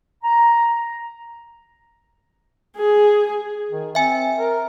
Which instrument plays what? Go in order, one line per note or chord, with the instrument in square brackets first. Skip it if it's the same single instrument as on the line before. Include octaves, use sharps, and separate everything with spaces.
[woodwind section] A#5
[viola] G#4
[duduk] D#3
[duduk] C4 [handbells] E5 G#5
[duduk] A#4